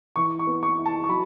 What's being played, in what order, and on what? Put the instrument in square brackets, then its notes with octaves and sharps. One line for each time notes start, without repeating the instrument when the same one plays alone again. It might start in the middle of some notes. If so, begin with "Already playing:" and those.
[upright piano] E3 C#6
C#6
B3
C#6
E4
A5
C#6
F#3 B5